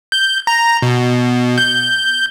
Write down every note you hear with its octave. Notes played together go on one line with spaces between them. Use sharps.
G6
A#5
B2
G6